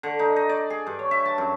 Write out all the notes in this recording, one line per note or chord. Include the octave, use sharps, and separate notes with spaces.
D3
D#4
D#5
D5
G#4
G2
C#5
E5
A5
F#2